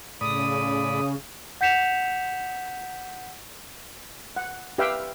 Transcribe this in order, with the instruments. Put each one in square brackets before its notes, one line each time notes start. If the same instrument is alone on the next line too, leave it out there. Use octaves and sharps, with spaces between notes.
[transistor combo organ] A2 D5 B5 [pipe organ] C#3 [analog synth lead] D#6
[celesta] F#5 G6 B6 C#7 E7 F7
[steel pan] F#5
G4 B4 E5 F5 G5